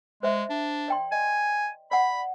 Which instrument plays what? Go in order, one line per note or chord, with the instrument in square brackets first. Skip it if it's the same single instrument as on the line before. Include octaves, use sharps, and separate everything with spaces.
[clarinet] G#3 [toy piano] C5 E5
[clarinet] D4
[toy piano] D5 G5 C6
[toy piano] D#5 [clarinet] G#5
[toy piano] D5 F#5 [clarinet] B5